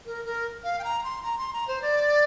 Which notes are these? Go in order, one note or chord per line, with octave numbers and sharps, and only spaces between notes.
A#4
A#4
F5
G5
A#5
C6
A#5
C6
A#5
C5
D5